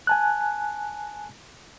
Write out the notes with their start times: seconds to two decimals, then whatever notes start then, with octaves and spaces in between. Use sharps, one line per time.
0.07 G#5 A5 F#6